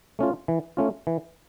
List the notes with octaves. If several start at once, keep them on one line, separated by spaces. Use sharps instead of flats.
A3 C#4 F4
E3
A3 C#4 F4
E3